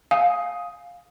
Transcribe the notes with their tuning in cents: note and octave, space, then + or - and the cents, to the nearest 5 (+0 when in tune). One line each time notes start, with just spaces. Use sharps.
F5 +15 G#5 +0 D#6 +10